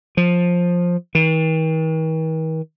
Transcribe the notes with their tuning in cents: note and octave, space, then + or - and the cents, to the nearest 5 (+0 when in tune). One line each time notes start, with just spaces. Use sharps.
F3 +10
D#3 +45